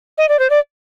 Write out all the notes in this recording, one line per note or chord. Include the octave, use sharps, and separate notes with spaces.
D#5
D5
C5
D5